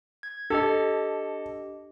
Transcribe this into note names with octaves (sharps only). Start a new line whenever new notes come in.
G#6
D4 G4 A4 D#5